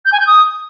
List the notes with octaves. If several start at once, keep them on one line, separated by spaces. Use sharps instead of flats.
G6
G#5
G6
D#6